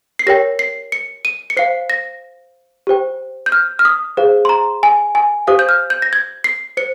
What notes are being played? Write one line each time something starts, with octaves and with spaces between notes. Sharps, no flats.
C7
G4 A#4 C#5 G5 A#6
C7
C#7
D#7
C#7
C5 F5 C7
A#6
G4 C5 G5
G6
F6
F6
D#6
G#4 C5 F5
C6
A#5
G#5
G#5
G4 C5 F5 D#6
G6
F6
G6
A#6
G#6
C7
C5 C#7